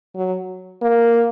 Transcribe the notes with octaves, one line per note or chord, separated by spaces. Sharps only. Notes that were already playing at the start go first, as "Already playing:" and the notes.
F#3
A#3